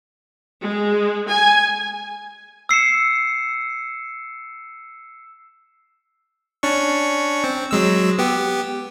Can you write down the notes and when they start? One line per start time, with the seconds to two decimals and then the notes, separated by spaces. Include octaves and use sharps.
0.61 G#3
1.29 G#5
2.69 E6 C7 C#7 E7
6.63 C#4 D4 C#6
7.44 C4
7.71 F#3 G#3 E6
8.18 B3 G4